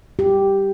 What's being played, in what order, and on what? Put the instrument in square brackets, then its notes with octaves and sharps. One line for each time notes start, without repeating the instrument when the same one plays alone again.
[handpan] G4